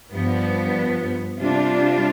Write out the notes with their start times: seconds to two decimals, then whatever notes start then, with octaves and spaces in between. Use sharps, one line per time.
0.12 G2 F3 B3
1.38 C3 G3 D4 F4